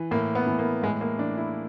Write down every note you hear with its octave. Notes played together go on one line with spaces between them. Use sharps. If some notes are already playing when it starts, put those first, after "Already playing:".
Already playing: E3
A2 A#3
B3
E3
A#3
A2 G#3
A#3
E3 D4
E4